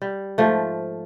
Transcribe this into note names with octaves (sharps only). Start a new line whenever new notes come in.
G3
G#2 F3 A3